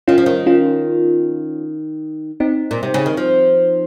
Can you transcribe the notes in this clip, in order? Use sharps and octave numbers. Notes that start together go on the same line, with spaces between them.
D#3 C#4 F4
F3
D#3
C#4 F4
C4 D#4
A#2
C3
C#3
D#3
F3